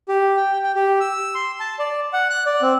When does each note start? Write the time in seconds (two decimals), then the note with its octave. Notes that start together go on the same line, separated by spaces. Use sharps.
0.08 G4
0.37 G5
0.63 G5
0.76 G4
1.00 E6
1.35 C6
1.60 A5
1.79 D5
2.13 F#5
2.30 F#6
2.46 D5
2.62 C4